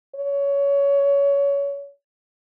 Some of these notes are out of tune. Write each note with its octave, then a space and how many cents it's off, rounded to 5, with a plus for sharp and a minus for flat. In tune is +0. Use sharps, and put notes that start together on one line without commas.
C#5 +20